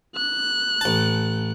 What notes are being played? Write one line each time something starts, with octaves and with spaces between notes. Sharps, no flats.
F#6
A1 A5